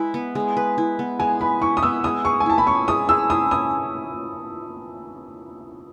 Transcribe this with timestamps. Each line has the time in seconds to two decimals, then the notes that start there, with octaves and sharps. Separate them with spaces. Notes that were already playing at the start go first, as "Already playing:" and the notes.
Already playing: G#3 E4 B4
0.14 B3
0.35 G#3
0.57 B4
0.78 E4
0.99 B3
1.19 G#3 G#5
1.41 B4 B5
1.61 E4 C#6
1.77 D#6
1.83 B3 E6
2.04 G#3 D#6
2.25 G#4 C#6
2.40 G#5
2.46 E4 A5
2.58 B5
2.67 C#4 C#6
2.88 G#3 D#6
3.09 G#4 E6
3.30 E4 D#6
3.51 C#4 D#6